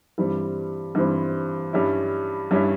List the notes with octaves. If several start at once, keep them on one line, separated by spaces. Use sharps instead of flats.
G2 E3 G3 C4
G2 E3 G3 C4
G2 G3 C#4 E4
G2 G3 C#4 E4